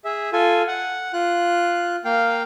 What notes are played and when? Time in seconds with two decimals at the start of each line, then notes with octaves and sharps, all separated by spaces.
0.05 G#4 E5
0.33 F4 A4 G#5
0.68 F#5
1.13 F4 F#6
2.05 A#3 F5 G5